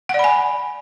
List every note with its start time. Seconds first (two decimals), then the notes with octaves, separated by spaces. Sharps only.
0.09 F#5
0.14 D5
0.19 B5
0.24 G#5